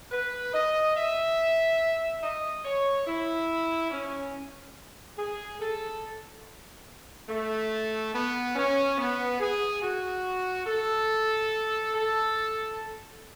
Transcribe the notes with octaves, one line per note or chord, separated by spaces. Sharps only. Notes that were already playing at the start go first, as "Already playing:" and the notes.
B4
D#5
E5
D#5
C#5
E4
C#4
G#4
A4
A3
B3
C#4
B3
G#4
F#4
A4
A4